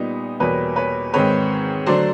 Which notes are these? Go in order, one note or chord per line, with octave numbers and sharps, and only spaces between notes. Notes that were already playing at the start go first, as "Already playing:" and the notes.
Already playing: A#2 G3 B3 D#4
E2 B2 G3 A#3 B4 C#5
B4 C#5
G#2 D#3 G#3 C4 B4 C#5
D3 F#3 A3 D4 C5 D5